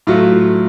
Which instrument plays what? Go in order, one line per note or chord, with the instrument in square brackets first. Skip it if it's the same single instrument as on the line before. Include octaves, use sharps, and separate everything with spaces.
[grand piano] A2 F#3 A3 F4